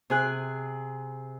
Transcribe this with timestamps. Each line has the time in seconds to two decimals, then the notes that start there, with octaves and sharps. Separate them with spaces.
0.10 C3 G#4 F#6